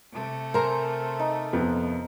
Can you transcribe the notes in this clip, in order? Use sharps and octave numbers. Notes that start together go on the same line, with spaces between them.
C3 A3
A#4 C5 G#5 A#5
D#4
F2 B3